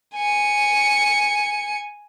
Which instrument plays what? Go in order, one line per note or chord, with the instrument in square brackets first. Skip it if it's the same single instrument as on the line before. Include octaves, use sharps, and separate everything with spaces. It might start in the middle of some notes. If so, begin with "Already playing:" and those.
[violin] G#5 C#7